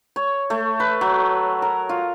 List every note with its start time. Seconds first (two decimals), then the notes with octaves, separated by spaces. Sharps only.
0.16 C#5
0.50 A3
0.80 B4
1.01 F#3
1.62 A#4
1.89 F4